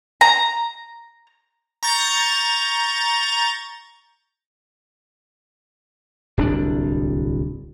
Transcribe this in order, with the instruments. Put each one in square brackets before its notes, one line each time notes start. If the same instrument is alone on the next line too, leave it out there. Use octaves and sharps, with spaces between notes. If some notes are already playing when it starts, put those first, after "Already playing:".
[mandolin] A#5
[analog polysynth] A#5 C#6 G6 A6
[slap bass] D1 C2 C#4 D4